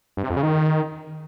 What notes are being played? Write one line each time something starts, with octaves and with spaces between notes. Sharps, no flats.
G2
C3
F2
C#3
D#3